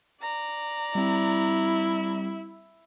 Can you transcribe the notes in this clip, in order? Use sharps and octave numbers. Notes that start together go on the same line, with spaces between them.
D5 A#5
G3 C4 E4